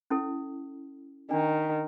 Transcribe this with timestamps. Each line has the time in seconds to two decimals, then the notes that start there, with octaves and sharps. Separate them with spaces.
0.10 C#4 E4 A4
1.31 D#3 D4